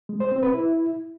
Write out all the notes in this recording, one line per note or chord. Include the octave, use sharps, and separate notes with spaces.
G#3
C5
C4
B4
E4